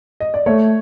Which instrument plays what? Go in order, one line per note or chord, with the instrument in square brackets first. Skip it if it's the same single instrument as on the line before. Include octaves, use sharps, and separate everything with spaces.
[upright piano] D#5
D5
[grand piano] A3 [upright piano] C#5